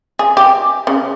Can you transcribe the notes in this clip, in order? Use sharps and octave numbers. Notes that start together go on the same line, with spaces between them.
G#4
G4
C#3